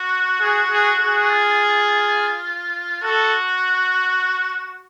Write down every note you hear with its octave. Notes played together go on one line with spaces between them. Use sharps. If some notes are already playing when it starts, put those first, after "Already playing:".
Already playing: F#4
G#4
G#4
G#4
F4
F#4 A4